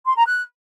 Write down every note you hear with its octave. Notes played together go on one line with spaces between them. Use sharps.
C6
A#5
F#6